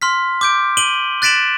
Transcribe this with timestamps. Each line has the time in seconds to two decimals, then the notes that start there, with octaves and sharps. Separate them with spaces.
0.02 C6 F6 B6
0.41 D6 G6 D7
0.77 D7 D#7 F#7 G7
1.22 F#6 A6 B6 D7 E7 F#7